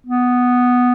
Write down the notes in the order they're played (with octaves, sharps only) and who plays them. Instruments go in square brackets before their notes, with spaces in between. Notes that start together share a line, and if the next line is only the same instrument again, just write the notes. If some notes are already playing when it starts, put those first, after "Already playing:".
[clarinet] B3